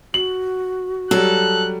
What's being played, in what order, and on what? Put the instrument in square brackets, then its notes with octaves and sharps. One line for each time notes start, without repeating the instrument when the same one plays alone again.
[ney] F#4 [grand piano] F#7
[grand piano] F#3 G3 [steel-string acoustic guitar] A4 [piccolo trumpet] F#6